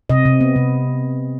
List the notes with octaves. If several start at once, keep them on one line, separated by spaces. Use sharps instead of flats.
C3 D#5
C3
B3
C3